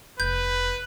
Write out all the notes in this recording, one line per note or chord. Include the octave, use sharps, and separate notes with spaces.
F1 B4 G6